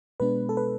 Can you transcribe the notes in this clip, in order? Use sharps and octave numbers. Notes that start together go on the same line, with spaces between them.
B2 G#3 B3 D4 B4
A4
B4